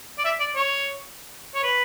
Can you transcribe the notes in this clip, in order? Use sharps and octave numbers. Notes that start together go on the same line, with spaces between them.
D5
E5
D5
C#5
C#5
B4